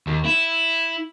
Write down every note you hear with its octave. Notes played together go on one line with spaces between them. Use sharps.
D#2
E4